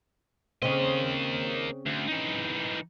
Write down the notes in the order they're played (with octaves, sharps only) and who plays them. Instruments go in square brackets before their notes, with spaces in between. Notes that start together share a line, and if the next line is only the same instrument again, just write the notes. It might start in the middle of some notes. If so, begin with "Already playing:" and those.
[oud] C#3 C4 [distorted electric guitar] A#3 D#5
[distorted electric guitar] D2
E3 D#4